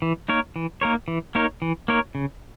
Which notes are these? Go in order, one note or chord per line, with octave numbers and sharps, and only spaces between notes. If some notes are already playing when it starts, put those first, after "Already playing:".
E3
A#3 D#4 A#4 C#5
E3
A#3 D#4 A#4 C#5
E3
A#3 D#4 A#4 C#5
E3
A#3 D#4 A#4 C#5
C#3